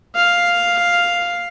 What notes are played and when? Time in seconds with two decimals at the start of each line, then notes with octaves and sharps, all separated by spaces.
0.16 F5